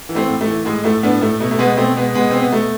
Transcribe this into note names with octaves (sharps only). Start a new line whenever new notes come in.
E3
A3 C4
A2
A3
E3
A2 G#3
A2 A3
A2 B3 D4
A2 A3
B2 A3
A3
B2 G#3 B3
B2 A3 C4
B2 G#3 B3
B2 G#3 B3
B2 C4
B3
B2 A3